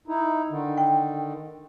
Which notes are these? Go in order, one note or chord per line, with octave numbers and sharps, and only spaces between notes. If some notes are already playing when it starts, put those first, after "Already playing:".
D#4 E4
D3 D#3
G5